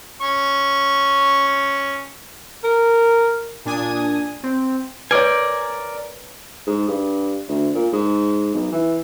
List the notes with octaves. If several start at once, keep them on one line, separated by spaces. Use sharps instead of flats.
C#4 C#6
A#4
A#2 D4 G#5 D#6
C4
A#4 B4 C#5 D5 G#5
G#2
G2
D2
A#2
G#2
B1
E3